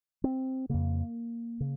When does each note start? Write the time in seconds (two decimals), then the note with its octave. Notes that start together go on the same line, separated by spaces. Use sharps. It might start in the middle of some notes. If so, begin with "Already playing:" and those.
0.24 C4
0.69 F2 C#3 A#3
1.60 C#3